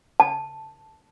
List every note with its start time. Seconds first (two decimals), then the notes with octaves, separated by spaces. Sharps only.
0.20 A5